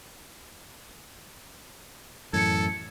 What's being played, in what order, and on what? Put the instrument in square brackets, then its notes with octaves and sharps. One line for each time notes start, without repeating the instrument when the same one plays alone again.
[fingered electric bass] F#2 A2 E3 [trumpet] A4 [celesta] G#6 C#7